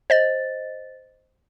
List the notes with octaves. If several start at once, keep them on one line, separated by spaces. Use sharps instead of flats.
C5 D#5 A6